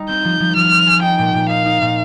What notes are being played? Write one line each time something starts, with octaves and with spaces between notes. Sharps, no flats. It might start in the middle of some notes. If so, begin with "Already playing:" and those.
Already playing: G3 D#4
C4 G6
F3
F3
F3 F6
C4
G#4
D#4 G5
A#2
A#2
D#4 F5
D#4
A#2